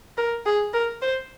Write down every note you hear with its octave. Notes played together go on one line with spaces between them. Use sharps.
A#4
G#4
A#4
C5